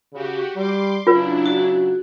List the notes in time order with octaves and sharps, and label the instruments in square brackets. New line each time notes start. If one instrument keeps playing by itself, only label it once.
[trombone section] C#3 [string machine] F#4 G4
[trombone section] G3 [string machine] C6 D6
[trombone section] C#3 F#3 [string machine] D4 E4 [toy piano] F4 B4
[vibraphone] F#4